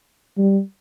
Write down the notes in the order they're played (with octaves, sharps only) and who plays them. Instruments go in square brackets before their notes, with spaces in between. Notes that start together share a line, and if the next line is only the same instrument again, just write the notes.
[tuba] G3